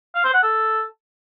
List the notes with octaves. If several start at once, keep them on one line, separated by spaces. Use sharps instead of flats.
F5
C5
F#5
A4